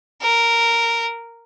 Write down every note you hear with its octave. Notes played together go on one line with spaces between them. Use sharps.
A#4